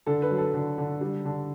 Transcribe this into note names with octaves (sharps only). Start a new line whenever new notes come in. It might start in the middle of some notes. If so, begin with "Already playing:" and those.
D3 A4
B4
F#3
A4
D3
D3
G3
D3